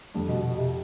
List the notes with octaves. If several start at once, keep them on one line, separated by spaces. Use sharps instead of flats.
F1 F2 D3 G3 D4
B2
B2
C3